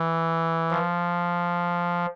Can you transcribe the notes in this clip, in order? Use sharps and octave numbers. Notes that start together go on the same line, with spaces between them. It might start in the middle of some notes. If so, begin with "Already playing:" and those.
Already playing: E3
F3